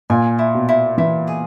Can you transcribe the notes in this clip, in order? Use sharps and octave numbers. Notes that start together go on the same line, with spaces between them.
A#2 G#5
E4
B2
E4
E3 E4
G#4